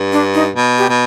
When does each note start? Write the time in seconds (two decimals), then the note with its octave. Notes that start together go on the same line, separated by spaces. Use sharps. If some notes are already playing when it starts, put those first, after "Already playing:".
Already playing: G2
0.12 D4
0.34 D#4
0.56 B2
0.78 G4
0.89 B2